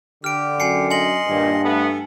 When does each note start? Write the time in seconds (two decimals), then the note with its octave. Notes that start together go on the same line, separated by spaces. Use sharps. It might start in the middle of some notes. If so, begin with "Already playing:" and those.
0.24 D3 G4 F6 D7
0.60 F#2 G#5 C7 C#7
0.91 D#5 G#5 C6 C#7 F#7
1.28 G2 A#2 D#3
1.64 A3 B3 A4